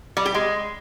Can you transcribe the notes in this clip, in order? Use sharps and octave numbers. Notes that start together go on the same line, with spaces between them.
G3
G4
G#3